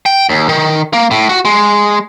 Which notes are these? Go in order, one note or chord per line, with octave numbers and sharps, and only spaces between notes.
G5
D#2
D#3
A#3
A2
F#4
G#3